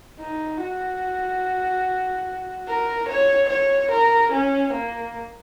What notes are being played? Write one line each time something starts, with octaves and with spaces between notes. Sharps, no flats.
D#4
F#4
A#4
C#5
C#5
A#4
C#4
A#3